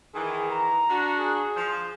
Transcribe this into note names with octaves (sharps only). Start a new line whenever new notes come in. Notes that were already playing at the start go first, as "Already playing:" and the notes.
D#3 E3 G#4
A#5
D4 F#4
G#4
F3